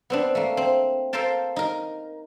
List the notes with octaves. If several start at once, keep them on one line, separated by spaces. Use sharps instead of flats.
B3 C4 D4
A3 A#3
C4
A4 A#4 C5 F5 G5 A5
D#4 A#4